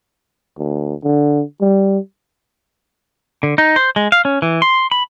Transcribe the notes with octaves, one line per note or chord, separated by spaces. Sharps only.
D2
D3
G3
D3
D#4
C5
G#3
F5
C#4
E3
C6
B5